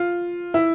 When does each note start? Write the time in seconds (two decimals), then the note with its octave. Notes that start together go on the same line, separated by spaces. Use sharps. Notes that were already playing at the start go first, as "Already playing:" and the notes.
Already playing: F4
0.54 E4